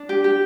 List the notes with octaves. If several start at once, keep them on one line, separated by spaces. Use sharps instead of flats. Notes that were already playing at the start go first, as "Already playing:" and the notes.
Already playing: D4
G4
G4